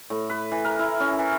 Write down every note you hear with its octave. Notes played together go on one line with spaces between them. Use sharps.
A2
B4
E3
A#4
E4
C#4
E3